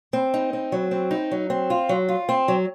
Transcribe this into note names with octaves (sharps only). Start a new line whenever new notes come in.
C4
D#4
C4
F#3
C4
D#4
F#3
C4
F4
F#3
F4
C4
F#3